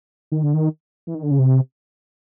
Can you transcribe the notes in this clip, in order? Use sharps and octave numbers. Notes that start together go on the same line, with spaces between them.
D#3
D3
D#3
E3
D#3
D3
C#3
C3